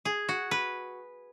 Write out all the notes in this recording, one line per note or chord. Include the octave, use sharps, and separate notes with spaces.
G#4
F#4
B4